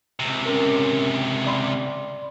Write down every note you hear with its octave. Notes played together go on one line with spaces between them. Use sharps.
C#2 C3
C#4 A#4
D5 B5 C6